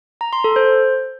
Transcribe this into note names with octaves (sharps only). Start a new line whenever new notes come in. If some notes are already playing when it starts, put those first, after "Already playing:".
A#5
C6
A4
C5